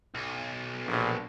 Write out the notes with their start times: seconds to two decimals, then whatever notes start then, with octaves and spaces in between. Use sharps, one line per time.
0.15 B1
0.86 A#1